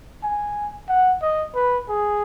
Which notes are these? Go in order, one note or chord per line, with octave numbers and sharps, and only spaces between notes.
G#5
F#5
D#5
B4
G#4